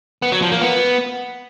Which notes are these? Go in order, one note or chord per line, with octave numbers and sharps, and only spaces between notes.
B3
F#3
F3
A#3
B3